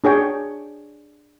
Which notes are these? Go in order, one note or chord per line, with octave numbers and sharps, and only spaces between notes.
D4 G#4 C#5 G5